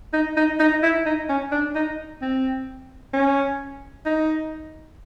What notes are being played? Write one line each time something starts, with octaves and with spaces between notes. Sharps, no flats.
D#4
D#4
D#4
E4
D#4
C#4
D4
D#4
C4
C#4
D#4